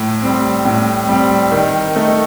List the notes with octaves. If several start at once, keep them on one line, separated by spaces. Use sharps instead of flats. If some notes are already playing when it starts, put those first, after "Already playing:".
Already playing: A2
G3 C4
A2
G3 C4
D#3
A3 D#4